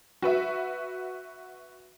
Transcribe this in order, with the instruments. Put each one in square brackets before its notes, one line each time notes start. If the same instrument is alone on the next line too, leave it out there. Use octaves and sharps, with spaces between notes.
[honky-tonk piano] F#4 B4 E5